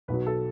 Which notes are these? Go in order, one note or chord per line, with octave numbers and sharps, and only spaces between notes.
B1 B2 F#3 B4
A4